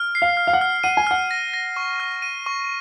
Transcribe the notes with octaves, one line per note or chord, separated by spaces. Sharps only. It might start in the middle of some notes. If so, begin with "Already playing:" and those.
Already playing: F6
C7
F5
F6
F5
F#5
F6
F#5 D#7
G#5
F#5 F6
A#6
A#6
C#6
F6
D#7
C#6